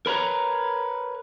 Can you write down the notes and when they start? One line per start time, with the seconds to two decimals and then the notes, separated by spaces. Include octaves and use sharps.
0.06 A#4 B4 C#5 A#5